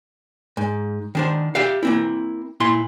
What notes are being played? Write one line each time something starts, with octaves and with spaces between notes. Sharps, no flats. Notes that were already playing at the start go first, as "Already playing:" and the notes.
G#2
D#3 D4 C5
G4 E5 F5
A#3 C4 E4
A#2 E4 C6